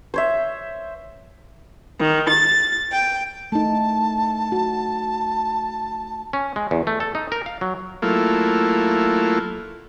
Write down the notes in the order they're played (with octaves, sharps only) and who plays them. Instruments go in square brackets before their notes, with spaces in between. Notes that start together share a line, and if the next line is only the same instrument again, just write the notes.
[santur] C5 C#5 E5
[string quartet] D#3
A6
G5
[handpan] A3 D#4 [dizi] A5
[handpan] F#4
[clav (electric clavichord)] C#4
G#3
E2
A3
A4
D#4
A#4
F5
F#3
[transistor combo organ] F#3 A3 A#3 E4 F4